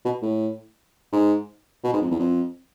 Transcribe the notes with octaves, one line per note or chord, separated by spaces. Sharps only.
B2
A2
G#2
B2
G#2
F2
E2
F2